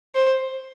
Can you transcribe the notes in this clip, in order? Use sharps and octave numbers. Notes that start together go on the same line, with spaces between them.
C5